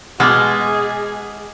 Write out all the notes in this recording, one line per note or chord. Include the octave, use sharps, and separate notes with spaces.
B2 G#3 G#4 D6 F6